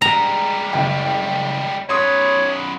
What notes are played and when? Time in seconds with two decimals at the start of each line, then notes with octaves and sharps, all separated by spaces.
0.02 G3 G#3 A#5
0.73 F#1 G5
1.89 F#2 B4 C#5 C6 D#6